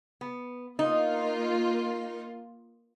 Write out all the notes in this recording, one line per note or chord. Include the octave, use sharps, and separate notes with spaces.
B3
A#3 D#4 F4